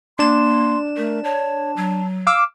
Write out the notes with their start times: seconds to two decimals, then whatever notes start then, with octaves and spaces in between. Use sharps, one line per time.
0.19 A#3 D4 C6 E7
0.97 A3 A#4
1.24 C#5 A5
1.76 F#3
2.27 F5 D6 E6